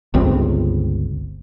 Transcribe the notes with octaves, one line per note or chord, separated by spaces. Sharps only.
G1 C#2 C4